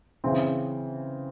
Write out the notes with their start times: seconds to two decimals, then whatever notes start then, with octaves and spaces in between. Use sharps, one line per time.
0.24 C#3 E3 C4